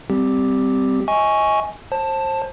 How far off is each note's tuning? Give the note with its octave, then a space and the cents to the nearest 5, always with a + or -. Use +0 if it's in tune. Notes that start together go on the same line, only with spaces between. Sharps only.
G3 -5 C4 -20 G4 +0
D#5 +25 G#5 +0 C#6 +0
C5 +30 A5 +5